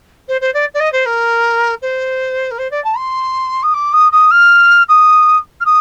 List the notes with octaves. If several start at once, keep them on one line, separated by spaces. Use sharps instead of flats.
C5
C5
D5
D5
D#5
C5
A#4
C5
A#4
C5
D5
A5
C6
D#6
D6
D#6
D#6
F6
D#6
F6
D#6